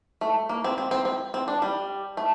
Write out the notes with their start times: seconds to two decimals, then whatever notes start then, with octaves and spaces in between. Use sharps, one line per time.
0.21 A3
0.49 A#3
0.64 C4
0.78 C4
0.91 C4
1.05 C4
1.34 C4
1.48 D4
1.62 G3
2.17 A3